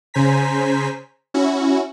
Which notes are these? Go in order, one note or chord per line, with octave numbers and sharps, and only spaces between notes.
C#3 C5 G#5 A#5 B6
C#4 E4 F#4